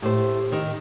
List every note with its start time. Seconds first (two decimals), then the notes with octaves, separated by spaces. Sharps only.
0.02 A2 G4 C5
0.52 D#3